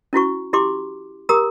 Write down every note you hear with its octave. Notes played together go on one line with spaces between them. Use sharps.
C#4 E4 F#4 C#6
E4 G4 C6 D6
G4 A#4 A#5 D#6 E6